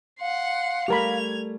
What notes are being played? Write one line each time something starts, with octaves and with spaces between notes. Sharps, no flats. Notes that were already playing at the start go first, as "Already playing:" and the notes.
F5 F#5 C6
G3 A3 G4 A#4 B5 G#6 F7